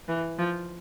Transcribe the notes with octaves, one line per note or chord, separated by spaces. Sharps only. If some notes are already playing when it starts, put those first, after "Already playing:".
E3
F3